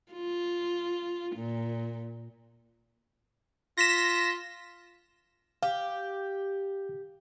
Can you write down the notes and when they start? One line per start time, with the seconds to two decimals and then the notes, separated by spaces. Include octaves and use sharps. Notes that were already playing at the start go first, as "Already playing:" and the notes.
0.12 F4
1.36 A#2
3.78 F4 A#6 B6 E7
5.63 G4 F5